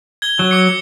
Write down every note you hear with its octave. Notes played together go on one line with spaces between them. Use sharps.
G#6 G7
F#3
D6 C#7